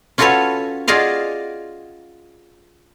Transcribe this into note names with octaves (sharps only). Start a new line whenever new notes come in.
C#4 F4 F#4 A4 B4 C#5
F4 F#4 G#4 D5 D#5 F5